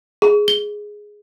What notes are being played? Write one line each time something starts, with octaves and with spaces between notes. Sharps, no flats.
G#4
G7